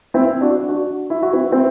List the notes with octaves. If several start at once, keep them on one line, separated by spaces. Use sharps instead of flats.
C4 E4
D4 F#4
D4 F#4
E4
F#4
C4 E4
C4 E4